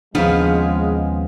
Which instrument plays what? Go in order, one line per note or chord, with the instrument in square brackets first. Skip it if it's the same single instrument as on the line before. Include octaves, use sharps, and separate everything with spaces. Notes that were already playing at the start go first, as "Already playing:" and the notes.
[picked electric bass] D#2 C4 D4 [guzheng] C#3 F3 B3 [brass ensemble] G#3